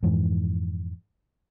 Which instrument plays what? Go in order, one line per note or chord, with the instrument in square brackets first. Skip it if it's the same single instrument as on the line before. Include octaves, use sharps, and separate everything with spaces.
[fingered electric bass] F2 G#2 E3